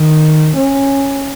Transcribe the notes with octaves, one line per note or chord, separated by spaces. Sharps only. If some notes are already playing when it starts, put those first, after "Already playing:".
Already playing: D#3
C#4